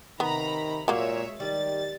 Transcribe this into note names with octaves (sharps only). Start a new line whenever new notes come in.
C3 D#3 B3 A#5 B5
A#2 F#3 G#3 A#3 C#5 E5
D#3 G3 A6